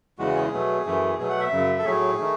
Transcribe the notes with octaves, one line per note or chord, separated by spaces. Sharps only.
E2 C#3 E3 G#3 F#4
G#4
B2 F#3 A3
F#2 E3 A3
B2 F#3 A3 G#4
F#5
E5
F#2 C#3 F#3
A4
A2 F#3 A3 G#4
D#3 A3